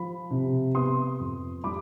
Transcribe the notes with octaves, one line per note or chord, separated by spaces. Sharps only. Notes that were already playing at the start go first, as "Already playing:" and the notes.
Already playing: F3 B5
C3
B3 C6 D#6
F2
G3 B5 D6